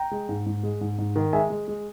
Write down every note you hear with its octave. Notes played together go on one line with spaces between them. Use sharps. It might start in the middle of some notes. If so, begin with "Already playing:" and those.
Already playing: G5 A#5
G#3
G#2
G#2
G#3
G#2
G#2
D#3
G#3 E5 G#5
G#3
G#3